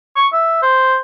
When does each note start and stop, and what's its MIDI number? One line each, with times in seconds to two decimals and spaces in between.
0.16 0.27 85
0.33 0.61 76
0.62 0.98 72